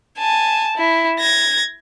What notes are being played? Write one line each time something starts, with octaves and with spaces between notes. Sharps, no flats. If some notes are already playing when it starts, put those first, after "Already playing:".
G#5 A5
E4
G#6 A#6